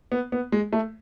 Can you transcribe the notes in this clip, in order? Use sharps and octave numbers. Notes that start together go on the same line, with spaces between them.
B3
B3
G#3
A3